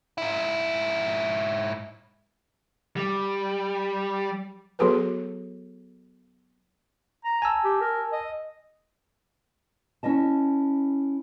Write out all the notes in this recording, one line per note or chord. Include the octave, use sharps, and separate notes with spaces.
G#2 E4
G3
F#3 B3 F#4 G#4 A4 B4
A#5
G#5 A5 E6
G4
A#4
D#5
C#4 E4 D#5 A5